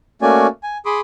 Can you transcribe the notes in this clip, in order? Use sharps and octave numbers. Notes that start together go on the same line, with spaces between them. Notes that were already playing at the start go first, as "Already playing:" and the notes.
A3 A#3 C#4 F#4 D5 G#5
G#5
G#4 B5 C6 D6 D#6